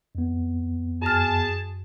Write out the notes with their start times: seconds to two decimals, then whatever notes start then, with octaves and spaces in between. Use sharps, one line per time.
0.15 F2 B3
1.02 F#2 G#4 A5 F6